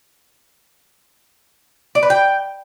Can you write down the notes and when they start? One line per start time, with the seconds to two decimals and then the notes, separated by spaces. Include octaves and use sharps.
1.95 D5
2.03 B4
2.10 G5